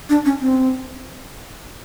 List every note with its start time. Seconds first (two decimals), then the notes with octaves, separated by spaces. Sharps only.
0.09 D4
0.25 C#4
0.41 C4